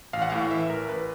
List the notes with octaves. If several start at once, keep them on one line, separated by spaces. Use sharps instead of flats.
A1 F5
F#5
A2 F5
E3 E5
A1 A#4
A1 B4